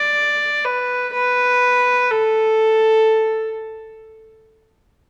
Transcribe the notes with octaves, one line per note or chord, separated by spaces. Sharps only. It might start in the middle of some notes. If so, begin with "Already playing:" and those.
Already playing: D5
B4
B4
A4